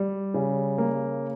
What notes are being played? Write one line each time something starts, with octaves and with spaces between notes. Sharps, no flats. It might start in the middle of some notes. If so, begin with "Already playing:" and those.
Already playing: G3
C#3
A#3